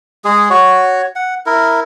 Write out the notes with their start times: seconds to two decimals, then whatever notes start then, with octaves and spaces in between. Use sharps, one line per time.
0.25 G#3 G#4
0.50 F#4 C#5
1.16 F#5
1.46 E4 A#4